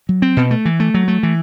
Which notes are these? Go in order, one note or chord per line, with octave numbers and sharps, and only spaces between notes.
F#3
C4
B2
A3
E3
A3
F#3
A3
E3